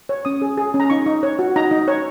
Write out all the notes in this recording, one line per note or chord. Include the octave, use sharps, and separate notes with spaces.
C#5
C#4 D#6
G#4
G#4
C#4
A#5
D#4 C#6
D#4
C#5
F#4
D#4 A#5
D#4
C#5